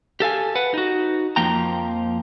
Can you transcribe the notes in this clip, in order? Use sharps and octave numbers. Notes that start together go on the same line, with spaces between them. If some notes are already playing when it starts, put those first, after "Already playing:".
G4 A4 F5 G#5
B4 F#5
D#4 F#4
F2 F3 A#3 G5 A#5